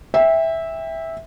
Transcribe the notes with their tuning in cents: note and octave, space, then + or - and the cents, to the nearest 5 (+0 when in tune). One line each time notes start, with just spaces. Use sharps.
E5 -10 G5 +30